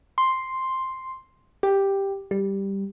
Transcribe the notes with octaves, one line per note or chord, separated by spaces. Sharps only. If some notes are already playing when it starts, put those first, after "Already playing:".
C6
G4
G3